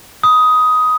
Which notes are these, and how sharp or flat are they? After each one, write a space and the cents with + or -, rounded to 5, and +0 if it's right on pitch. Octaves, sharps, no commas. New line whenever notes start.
B5 +5 D#6 +10